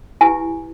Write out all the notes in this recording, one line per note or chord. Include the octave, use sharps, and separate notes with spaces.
E4 G4 B4 G#5